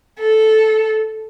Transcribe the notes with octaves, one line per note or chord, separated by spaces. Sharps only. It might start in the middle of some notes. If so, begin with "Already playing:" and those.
A4